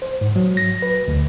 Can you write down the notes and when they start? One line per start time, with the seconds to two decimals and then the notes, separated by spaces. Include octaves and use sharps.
0.02 C5
0.21 G#2
0.36 F#3
0.57 A#6
0.82 B4
1.08 D2